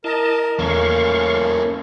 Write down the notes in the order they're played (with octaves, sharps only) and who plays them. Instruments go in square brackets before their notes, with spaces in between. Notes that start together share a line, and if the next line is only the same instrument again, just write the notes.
[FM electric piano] E4 [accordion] A#4 [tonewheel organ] D#5 A5
[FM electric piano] E2 [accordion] A#2 E3 A3 [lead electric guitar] A#3 C#4 [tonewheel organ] F5 C#6